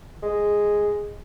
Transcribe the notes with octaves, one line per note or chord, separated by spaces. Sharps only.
G#3